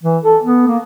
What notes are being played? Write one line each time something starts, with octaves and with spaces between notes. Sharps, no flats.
E3
A4
B3
A#3